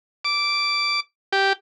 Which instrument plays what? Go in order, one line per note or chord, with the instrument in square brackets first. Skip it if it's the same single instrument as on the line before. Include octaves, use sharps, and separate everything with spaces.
[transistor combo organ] D6
G4